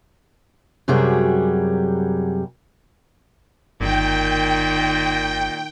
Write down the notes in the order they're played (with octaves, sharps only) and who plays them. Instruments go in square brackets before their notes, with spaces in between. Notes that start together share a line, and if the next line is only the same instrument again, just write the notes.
[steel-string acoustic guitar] F#2 C3 F#3 G3 G#4
[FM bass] G1 [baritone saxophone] A#2 [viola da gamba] D#3 [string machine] G5